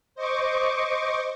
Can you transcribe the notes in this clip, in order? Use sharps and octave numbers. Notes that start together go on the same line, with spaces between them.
C5 D#5 C#6 D6